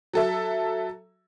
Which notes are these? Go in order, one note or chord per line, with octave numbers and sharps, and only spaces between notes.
F#3 A4 E5